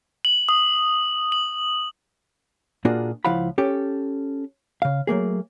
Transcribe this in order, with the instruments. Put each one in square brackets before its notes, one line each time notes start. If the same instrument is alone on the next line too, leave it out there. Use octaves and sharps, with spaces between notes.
[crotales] F#7
D#6
F#7
[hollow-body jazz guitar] A#2 A#3 D4 F4 F#4 G#4
C#2 F3 E4 F5 F#5 B5
C#4 G4 A4
C#3 F5
F#3 A3 A#3 G#4